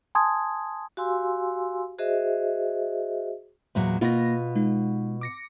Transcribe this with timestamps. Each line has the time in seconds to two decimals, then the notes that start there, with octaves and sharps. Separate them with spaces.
0.15 G#5 A5 C6 D#6 G#6
0.97 F#4 G4 F5 G#5 C6 E6
1.98 F#4 G#4 C5 D#5 E5
3.75 E2 A#2 F#3
4.01 B2 A#3 B3 F4 A#6
4.55 G#3 D#4
5.21 D6 A#6 C#7